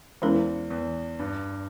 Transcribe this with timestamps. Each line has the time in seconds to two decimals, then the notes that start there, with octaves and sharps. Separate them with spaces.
0.22 E2 E3 G#3 C#4 E4 A#4
0.70 E2
1.20 G2